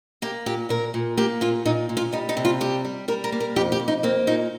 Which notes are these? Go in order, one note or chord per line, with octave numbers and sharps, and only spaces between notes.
A#3 G4
A#2 G4
A#2 A#4
A#2
A#3 G4
A#2 F4
A#2 D#4
A#2
F4
G3 D#4
D#4
C3
F4
G3 G4
G3
G3 A#4
A#4
A#3
A#4
F2 G4
G4
F2
D#4
A#3 C4
A#2 D#4